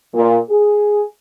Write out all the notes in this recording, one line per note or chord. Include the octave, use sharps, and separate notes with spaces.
A#2
G#4